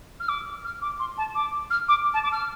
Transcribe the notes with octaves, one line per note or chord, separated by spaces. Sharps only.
F6
D6
F6
D6
C6
A5
D6
F6
D6
A5
D6
F6